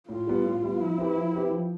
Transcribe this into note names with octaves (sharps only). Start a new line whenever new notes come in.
A2 F4
G3 B3
A2
G3 B3
F3 E4
C4 G4 B4
F3
C4 G4 B4
F3